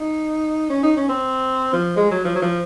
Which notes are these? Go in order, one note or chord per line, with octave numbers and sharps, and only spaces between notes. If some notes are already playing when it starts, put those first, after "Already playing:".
Already playing: D#4
C#4
D#4
C#4
C4
F3
G#3
F#3
F3
F#3
F3